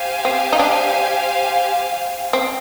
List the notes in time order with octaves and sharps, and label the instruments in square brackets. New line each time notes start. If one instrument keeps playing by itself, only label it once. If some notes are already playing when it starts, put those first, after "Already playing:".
Already playing: [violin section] G4 C5 F5 G#5
[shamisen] C4
D#4
D4
C4